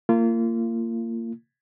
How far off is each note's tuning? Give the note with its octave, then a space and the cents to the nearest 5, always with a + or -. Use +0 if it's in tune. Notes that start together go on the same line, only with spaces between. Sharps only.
A#3 -25 F4 -30